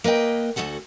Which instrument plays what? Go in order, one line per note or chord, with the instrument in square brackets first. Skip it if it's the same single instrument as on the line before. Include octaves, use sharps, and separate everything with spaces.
[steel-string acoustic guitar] A#3 B4 D#5 G5
D2 D#3 F#4 A4 F#5